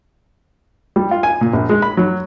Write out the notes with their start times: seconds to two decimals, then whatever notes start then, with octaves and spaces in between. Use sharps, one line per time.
0.96 G3
1.11 F4
1.23 G#5
1.41 A#2
1.53 A#1
1.69 G#3
1.82 B5
1.97 F#3